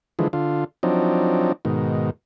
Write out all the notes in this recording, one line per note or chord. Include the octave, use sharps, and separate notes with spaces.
D3 E3 F3 G#3
D3 F4
F3 F#3 C4 D4 D#4
G#2 B2 D#3